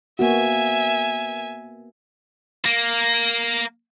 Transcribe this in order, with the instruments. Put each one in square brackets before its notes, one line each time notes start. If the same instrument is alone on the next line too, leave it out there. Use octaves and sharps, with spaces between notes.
[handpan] A#3 B3 F#4 [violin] E5 G#5
[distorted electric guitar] A#3